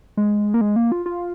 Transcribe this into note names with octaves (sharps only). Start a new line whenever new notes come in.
G#3
A#3
G#3
A#3
F4
F4